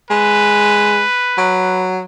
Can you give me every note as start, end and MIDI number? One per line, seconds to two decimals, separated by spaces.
0.11 1.02 56
0.11 1.86 71
1.38 2.03 54